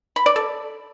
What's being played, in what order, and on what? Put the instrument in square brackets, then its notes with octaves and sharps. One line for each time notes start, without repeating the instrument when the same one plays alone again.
[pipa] B5
D5
A4